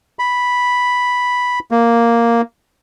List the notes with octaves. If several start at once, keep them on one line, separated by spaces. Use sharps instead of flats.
B5
A#3